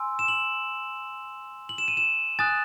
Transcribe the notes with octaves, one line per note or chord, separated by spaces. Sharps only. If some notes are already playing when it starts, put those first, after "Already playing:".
Already playing: G#5 C6 E6
E7
F#7
F#7
E7
D#7
E7
G#5 D#6 F#6 A6